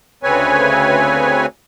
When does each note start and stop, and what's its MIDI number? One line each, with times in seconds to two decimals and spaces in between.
0.23 1.46 38
0.23 1.46 49
0.23 1.46 60
0.23 1.46 71
0.23 1.46 73
0.23 1.46 80